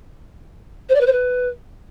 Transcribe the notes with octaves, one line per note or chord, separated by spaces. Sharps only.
C5
D5
B4
C5
B4